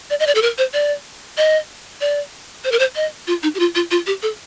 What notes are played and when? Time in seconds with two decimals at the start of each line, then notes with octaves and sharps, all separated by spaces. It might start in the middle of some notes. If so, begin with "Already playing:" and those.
0.10 D5
0.20 D#5
0.27 D5
0.35 A4
0.42 A#4
0.58 C5
0.73 D5
1.37 D#5
2.01 D5
2.64 C5
2.72 A#4
2.79 C5
2.96 D#5
3.27 F4
3.43 D#4
3.55 G4
3.59 F4
3.75 F4
3.91 F4
4.07 G4
4.22 A4